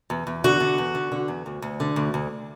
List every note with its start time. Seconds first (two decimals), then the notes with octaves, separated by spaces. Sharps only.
0.10 E2
0.27 E2
0.44 D3 F#4
0.60 D3
0.78 E2
0.95 D3
1.12 D3
1.28 E2
1.46 D2
1.62 D2
1.80 D3
1.96 D2
2.14 D2